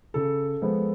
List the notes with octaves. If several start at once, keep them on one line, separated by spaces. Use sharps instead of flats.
C#3 A4
F3 G#3 B3